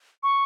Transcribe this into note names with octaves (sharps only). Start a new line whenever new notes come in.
C#6